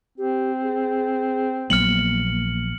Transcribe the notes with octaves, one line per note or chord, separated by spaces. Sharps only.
C4 G4
G#4
A#1 F#3 A#3 B3 F6 C#7 F#7